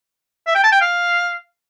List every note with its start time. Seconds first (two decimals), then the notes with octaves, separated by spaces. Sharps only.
0.46 E5
0.55 G5
0.64 A5
0.72 G5
0.81 F5